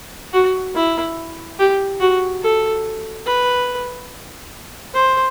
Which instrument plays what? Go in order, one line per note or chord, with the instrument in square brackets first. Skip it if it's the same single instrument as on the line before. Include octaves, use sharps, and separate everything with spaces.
[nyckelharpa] F#4
E4
G4
F#4
A4
B4
C5